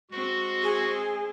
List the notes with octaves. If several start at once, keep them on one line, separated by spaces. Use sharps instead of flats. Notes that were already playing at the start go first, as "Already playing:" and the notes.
G#3 C4 F#4
G#4